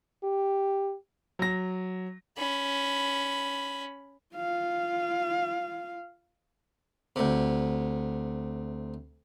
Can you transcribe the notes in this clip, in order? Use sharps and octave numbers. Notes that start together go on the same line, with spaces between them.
G4
F#3 A#6
C#4 B5
F4 F5
D2 C3